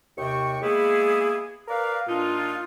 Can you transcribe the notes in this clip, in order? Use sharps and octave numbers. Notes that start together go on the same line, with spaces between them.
D#2 C3 G5 C#6
G#3 A#3 B3 E4 G#4
A#4 B4 D5 F5
A#2 D4 D#4 F4